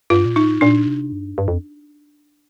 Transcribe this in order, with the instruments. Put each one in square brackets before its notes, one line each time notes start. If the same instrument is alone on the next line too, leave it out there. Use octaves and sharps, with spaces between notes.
[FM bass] G2 [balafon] F4
[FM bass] A#2
[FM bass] A2 [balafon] D#4
[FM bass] A#2 [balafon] D4
[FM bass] C3
G2
G2
F2